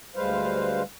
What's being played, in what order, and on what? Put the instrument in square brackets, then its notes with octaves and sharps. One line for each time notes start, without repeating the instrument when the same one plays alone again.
[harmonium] D2 G3 G#3 B4 C5 F5